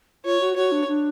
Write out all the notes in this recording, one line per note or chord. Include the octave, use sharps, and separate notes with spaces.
F4 C#5
F#4
F#4 C#5
D4
D4